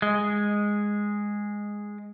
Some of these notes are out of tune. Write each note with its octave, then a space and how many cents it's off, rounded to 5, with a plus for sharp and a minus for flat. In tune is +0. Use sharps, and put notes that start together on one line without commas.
G#3 -5